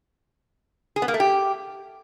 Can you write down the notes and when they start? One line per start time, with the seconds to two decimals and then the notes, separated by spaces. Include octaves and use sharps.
0.96 G#4
1.02 B3
1.08 A#3
1.14 A3
1.20 G4